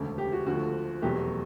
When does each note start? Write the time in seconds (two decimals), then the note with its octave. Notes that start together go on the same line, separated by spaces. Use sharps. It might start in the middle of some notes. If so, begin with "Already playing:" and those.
Already playing: E1 D2 C#3
0.18 G4
0.32 F#4
0.46 D2 D3 F3 F#4
1.02 F1 E2 B2 F#3 G4